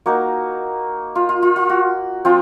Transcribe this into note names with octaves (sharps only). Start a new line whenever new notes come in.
A#3 D#4 F#4
F4
F4
F4
F4
F#4
F3 C4 F4